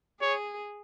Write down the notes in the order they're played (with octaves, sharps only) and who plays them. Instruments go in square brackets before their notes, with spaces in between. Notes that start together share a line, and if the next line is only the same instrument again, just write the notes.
[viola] G#4 [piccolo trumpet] C#5